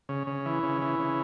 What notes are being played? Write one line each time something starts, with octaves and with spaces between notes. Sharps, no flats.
C#3
C#3
E3
C#3
E3
C#3